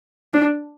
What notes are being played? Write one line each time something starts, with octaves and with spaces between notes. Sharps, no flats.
D4